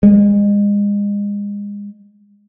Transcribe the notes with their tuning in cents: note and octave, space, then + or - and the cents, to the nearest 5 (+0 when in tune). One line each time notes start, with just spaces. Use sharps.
G#3 -30